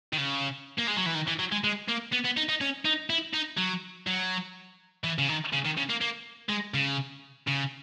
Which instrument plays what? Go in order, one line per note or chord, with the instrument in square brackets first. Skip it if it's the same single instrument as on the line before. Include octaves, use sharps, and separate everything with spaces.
[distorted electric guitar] D#3
C#3
A#3
G#3
F#3
E3
D#3
E3
F#3
G#3
G#3
A#3
B3
B3
D#4
D#4
C#4
D#4
E4
D#4
F#3
F#3
E3
C#3
D#3
C#3
D#3
C#3
A#3
A#3
G#3
C#3
C#3